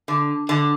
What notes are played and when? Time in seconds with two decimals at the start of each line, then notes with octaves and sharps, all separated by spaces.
0.08 D3
0.49 D3